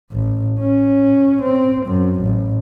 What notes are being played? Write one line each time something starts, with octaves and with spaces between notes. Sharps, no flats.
A1
C#4
C4
F#2
A1